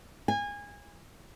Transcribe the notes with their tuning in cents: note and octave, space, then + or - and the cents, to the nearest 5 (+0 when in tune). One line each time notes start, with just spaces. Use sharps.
G#5 -25